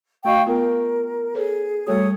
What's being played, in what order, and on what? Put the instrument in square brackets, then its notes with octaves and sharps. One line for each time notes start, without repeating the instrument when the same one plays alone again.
[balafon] A3 F#4 D#5 [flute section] F5 G5 C#6
[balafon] B3 F4 [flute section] A#4
[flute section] G#4 [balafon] A4 B4 C#5
[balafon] G3 A3 F#4 [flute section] A4 C#5 D#6